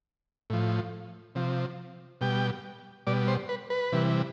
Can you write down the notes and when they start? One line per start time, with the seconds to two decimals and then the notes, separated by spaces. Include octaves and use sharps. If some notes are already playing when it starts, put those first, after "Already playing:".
0.50 A2 F3
1.35 C3 F3
2.21 B2 G3 G5
3.07 B2 G3 D5
3.28 C5
3.49 B4
3.70 B4
3.92 C3 E3 G3